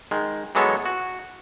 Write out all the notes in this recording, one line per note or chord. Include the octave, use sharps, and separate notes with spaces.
D#3 G#3
E3 F#3 G#3 B3 A4 C#5
F#4